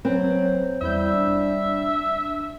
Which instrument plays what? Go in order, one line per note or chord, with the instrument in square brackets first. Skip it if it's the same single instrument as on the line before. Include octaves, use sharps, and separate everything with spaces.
[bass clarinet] F#3 [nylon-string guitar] C4 [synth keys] B4
[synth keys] E2 E4 G6 [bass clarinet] G3 [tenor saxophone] E5
[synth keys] D4